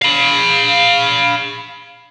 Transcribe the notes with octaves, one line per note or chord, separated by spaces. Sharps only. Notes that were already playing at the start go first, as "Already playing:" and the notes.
F5 B5